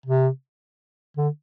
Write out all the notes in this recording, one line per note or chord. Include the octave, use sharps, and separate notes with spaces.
C3
D3